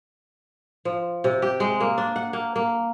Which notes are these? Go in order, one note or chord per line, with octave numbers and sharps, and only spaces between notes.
F3
C3
G4
G#3
A#3
D4
F#5
A#3
A#3